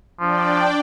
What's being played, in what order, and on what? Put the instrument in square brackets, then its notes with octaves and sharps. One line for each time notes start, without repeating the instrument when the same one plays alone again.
[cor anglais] F3 [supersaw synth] D4 D5 G5